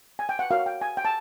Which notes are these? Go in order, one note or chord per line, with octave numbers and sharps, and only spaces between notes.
G#5
G5
F#5
F#4 A#4 C#5 F5
G5
G#5
G5
A5